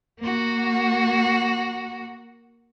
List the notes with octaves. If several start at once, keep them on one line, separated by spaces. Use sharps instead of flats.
A#3 F#4